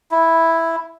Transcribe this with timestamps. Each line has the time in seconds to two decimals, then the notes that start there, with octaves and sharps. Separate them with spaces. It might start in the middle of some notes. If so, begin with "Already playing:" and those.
0.11 E4